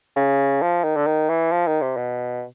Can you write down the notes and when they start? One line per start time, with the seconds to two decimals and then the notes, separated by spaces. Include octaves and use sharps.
0.16 C#3
0.62 F3
0.84 D#3
0.96 D3
1.06 D#3
1.29 E3
1.52 F3
1.67 D#3
1.82 C3
1.97 B2